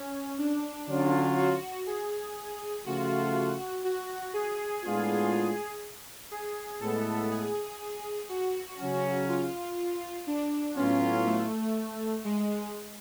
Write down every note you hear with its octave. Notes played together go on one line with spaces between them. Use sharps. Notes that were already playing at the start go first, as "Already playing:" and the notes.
Already playing: C#4
D4
D3 F#3 C#4 F4
F#4
G#4
C#3 F3 A3 F4 F#4
F#4
G#4
A2 G#3 B3 D4 F4
G#4
A2 G#3 B3 A4
G#4
F#4
C#3 F#3 C#4
F4
D4
A2 F#3 B3 C#4 F4
A3
G#3